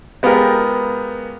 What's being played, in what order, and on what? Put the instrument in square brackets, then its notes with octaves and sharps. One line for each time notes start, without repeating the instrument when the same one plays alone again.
[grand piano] G#3 B3 F4 G4 A#4